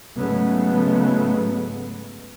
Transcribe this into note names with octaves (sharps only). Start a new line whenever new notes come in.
G#2 C#3 F#3 G#3 A3 B3